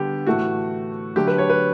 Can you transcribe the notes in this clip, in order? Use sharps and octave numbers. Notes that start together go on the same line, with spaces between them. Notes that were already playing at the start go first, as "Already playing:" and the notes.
Already playing: D3 G3 B3 G4
A2 E3 A3 F#4
D3 F#3 A3 G4
B4
C#5
B4